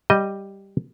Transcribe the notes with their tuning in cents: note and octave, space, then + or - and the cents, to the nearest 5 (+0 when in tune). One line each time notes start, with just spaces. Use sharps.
G3 +0 D#5 +0